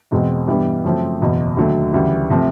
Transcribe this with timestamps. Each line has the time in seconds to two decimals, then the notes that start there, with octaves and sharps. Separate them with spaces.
0.11 E2 B2 G#3 C4
0.48 G2 E3 G3 B3
0.84 F#2 C#3 F3 A3 C4
1.21 F#1 E2 B2
1.57 D#2 D3 F#3 A3
1.93 D2 C#3 E3 G3
2.30 C3 F3 A3